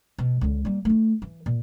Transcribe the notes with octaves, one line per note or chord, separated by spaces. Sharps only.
B2
C#2 D3
G3 A#3
A3 D#4
E3
A#2